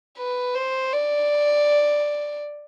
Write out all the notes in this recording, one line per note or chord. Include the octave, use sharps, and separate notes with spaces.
B4
C5
D5